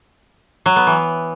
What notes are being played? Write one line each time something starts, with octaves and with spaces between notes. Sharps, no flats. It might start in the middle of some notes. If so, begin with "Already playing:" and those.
F#3
B3
E3